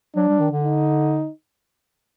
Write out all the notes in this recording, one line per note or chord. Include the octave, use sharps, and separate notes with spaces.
F#3 D4
G3
D#3
D3
D#4